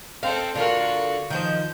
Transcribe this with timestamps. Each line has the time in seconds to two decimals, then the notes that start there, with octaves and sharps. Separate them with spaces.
0.23 C4 A4 F5
0.55 D3 F4 F#4 A4 A#4
1.30 D#3 F3 C5 G6